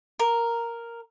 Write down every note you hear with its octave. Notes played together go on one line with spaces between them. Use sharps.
A#4